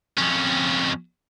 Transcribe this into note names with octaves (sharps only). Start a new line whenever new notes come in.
F2 C#4